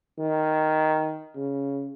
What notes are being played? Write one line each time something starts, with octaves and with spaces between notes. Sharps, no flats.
D#3
C#3